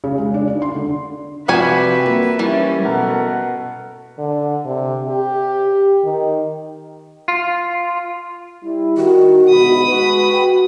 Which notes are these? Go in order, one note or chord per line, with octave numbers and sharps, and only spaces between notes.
C#3
G#3
D4
D4
C6
D3
C3 F3 G3 F#4 B4 E5 G#5
A#3
E3 G3 C#4
B2 A4 A#4 F#5
D3
C3
G4
D#3
F4
G3 E4
D#3 F#4
D2 G#2 B2 B5 D#6
G#3 F#4 B4
F#4 G5